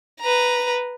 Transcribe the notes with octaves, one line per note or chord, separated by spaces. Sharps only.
B4 A#5